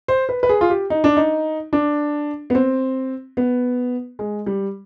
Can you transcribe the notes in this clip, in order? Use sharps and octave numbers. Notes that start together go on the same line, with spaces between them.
C5
B4
B4
G#4
F4
G4
D#4
D4
D#4
D4
B3
C4
B3
G#3
G3